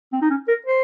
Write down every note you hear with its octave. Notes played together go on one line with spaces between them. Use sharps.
C4
D#4
C#4
A#4
C5